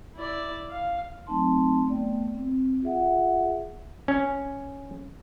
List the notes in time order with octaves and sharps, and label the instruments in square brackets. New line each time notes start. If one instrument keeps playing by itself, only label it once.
[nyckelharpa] E4 D5
F5
[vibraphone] F#3 A3 C4 D#4 A5 C6
A3 B3 D5 G5
C4
F4 G#4 E5 F#5
[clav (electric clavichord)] C#4